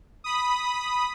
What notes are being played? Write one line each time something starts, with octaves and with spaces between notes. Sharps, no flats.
B5 D#6